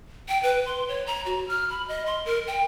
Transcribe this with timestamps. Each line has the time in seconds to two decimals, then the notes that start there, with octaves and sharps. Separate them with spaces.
0.29 G5
0.43 B4
0.66 C6
0.88 C#5
1.07 A#5
1.26 F#4
1.48 F6
1.70 B5
1.88 D#5
2.06 C6
2.25 A#4
2.47 G5